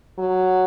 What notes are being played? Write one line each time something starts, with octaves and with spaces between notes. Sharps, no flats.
F#3